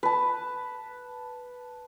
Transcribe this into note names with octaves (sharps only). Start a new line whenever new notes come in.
B4 A5